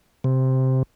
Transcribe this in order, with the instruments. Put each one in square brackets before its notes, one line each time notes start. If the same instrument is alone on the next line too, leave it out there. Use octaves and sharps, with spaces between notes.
[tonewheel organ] C3